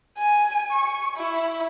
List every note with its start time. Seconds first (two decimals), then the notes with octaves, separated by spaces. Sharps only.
0.18 G#5
0.71 C#6
1.17 E4